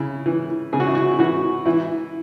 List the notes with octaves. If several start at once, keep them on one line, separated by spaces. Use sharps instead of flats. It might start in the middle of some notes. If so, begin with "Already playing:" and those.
Already playing: C#3 E4
E3
C#3 G#4
F#4
E4
F#4
E4
E3 F#4
E3 E4